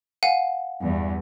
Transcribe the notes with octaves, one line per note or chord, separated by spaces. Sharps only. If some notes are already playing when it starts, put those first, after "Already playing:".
F5 F#5 G#5
E2 G2